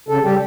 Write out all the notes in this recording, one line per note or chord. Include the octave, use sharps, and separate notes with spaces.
C#3 A4
G3 G4